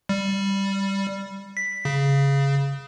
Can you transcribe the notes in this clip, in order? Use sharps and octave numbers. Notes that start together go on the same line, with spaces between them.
G3
B6
C#3